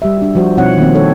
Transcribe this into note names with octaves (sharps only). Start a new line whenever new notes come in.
G3 G4 E5
D4 F#4
F3 G3 F#4 C5
B2 F3 C4 D#4 C#5 F#5
D#3 A#3 C4
D#4 A4 C#5